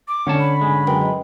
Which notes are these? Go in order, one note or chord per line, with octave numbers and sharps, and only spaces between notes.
D6
D3 C#4 C#5 F#5 A5
B5
G#2 C#3 G#3
F#2 G#3 A#4 B4 G5
D#5